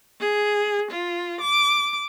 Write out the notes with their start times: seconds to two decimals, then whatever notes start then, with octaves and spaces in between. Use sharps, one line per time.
0.20 G#4
0.91 F4
1.40 D6